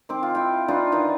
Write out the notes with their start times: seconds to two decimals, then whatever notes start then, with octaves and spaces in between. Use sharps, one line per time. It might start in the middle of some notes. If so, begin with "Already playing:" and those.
0.09 D#3 C4 D6
0.23 F4
0.35 E4 F4 G5
0.68 D4 D#4 F4 B4
0.92 D#3 E3 D#4